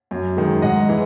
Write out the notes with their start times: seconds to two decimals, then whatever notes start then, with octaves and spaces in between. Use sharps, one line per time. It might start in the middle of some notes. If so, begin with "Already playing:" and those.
0.11 F#2
0.37 D#3 G#3
0.62 G#2 D#5 F#5
0.88 E3 G#3